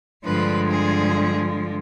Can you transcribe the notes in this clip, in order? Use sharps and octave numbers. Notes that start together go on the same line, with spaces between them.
G2 D3 F3 G#3 B4
G#4